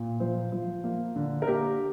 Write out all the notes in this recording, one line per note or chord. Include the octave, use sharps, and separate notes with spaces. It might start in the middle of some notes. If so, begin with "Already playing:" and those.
Already playing: A#2
F3 C5
F3
A#3
D3
A#4
A#3 G4